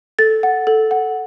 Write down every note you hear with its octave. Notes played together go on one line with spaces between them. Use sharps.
A4 A6
F#5
A4
F#5